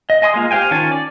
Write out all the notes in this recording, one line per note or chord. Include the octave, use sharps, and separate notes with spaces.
D#5
D#5 G#5 C6 D#6
G#3 A#3 F4
G4 C5 F5 G5 G#5
D#3 C#4 F4 G#5 A5
D5